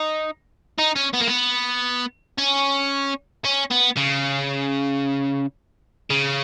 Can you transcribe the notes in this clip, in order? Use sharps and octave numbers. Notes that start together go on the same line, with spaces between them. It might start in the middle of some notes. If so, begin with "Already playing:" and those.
Already playing: D#4
D#4
C#4
B3
A#3
B3
C#4
C#4
B3
C#3
C#3